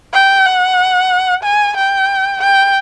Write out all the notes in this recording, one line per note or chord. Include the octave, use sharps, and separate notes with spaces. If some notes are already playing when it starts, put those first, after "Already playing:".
G5
F#5
G#5
G5
G5